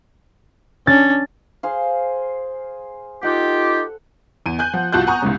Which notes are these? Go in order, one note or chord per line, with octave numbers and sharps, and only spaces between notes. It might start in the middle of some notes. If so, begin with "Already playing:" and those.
C#4 D4 A6
G#4 C5 F5
D#4 F4 G4 A4 F#5
E2 D#7
G#5 F#6 G6
F3 F#5
C2 F4 F#4 A5 F#6 G6
F#5 G#5 A#5 C#6 D#6
C2 G#2 C#3